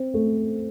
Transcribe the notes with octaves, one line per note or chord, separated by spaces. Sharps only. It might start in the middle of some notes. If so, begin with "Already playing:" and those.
Already playing: C4
A3